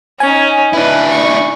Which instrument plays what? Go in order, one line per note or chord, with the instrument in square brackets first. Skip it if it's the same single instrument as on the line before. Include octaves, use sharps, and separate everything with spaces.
[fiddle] C#4 D#4 [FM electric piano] G#5
[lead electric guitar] D4 E4 [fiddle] B4
[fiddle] C#6